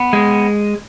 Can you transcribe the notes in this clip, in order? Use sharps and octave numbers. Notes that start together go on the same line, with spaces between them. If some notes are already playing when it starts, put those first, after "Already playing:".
Already playing: B3
G#3